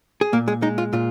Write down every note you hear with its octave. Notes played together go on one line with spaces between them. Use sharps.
G#4
A#2 A#3 A#4
G#3 G#4
G#3 D#4
F4
A#2 F4